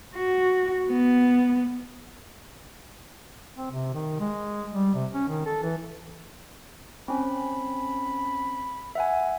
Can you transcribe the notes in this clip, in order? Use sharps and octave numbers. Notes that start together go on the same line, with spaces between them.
F#4
B3
C4
C3
D#3
G#3
G3
C3
C#4
D#3
A4
E3
C4 C#4 B5
E5 F#5 G#5